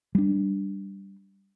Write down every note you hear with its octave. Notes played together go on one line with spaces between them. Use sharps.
G3 D4